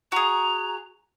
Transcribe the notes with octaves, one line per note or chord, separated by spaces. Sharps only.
F#4 G#4 A#5